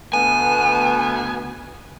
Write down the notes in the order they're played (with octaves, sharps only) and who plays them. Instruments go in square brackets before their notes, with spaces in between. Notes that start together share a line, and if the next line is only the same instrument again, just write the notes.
[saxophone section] D2 A3 B3 [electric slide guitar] G#5